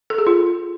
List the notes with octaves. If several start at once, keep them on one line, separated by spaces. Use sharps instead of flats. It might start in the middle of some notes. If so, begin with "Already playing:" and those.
A4
G#4
F4